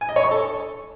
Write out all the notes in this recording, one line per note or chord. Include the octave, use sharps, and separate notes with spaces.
G#5
D#5
C#5
C#6
A4